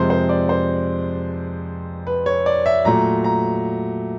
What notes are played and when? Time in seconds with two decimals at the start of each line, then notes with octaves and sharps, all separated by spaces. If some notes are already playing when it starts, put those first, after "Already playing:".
Already playing: F2 C3 F3 G#3 C5
0.10 C5
0.29 D5
0.49 C5
2.07 B4
2.26 C#5
2.46 D5
2.66 E5
2.85 A#2 F#3 A3 A#5
3.24 A#5